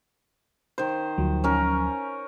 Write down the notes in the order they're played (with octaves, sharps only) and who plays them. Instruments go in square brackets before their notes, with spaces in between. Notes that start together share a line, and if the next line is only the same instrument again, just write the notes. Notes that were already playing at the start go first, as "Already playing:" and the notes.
[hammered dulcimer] D#3 C5
[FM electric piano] D2 F3 F#3
[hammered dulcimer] C#4 A#4